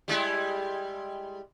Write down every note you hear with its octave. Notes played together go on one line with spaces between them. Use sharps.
G3 G#3 E4